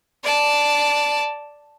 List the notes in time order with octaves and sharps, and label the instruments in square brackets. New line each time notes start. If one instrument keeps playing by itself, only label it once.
[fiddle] D5 A5